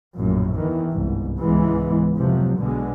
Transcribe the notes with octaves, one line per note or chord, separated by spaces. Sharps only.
A#1 F#2 A2
E2 D#3 E3
G1 C2 G#2
C#2 G#2 E3 G#3 B3
F1 C3 F3 F#3
B1 B2 D3 G#3